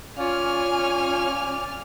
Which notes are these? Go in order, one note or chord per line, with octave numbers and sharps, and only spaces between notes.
C#4 F4 D5 G#5 F6